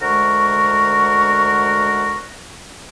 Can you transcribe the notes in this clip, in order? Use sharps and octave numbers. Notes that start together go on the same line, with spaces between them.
D2 G#3 A#4 F#5 C#6